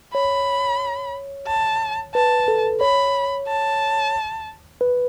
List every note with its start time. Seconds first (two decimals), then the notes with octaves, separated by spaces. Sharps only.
0.14 C#5 B5
1.47 A5
2.15 B4 A5
2.48 A4
2.81 C#5 B5
3.48 A5
4.81 B4